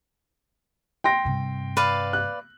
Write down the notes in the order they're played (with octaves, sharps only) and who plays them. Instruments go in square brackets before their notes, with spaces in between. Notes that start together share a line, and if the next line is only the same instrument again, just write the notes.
[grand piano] G5 C6 A#6
[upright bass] G2 C3
[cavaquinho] B4 D5 F5
[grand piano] F#6